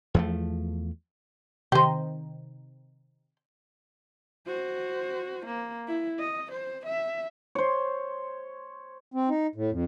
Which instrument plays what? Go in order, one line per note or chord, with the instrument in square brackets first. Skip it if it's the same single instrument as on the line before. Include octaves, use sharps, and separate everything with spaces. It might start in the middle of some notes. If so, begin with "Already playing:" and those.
[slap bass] E2 F3 A3
[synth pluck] C3 D#3 [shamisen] G4 C5
[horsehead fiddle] F#4 C5
A#3
E4
D#5
C5
E5
[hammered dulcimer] C5 C#5
[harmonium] C4
D#4
A2
F2